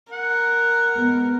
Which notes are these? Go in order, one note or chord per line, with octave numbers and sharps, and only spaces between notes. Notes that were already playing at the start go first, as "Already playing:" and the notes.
A#4 F#5
G#3 B3